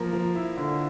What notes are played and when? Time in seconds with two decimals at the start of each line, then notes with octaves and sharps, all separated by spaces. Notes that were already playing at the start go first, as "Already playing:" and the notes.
Already playing: F3 A#3
0.13 F3
0.35 E4
0.57 D3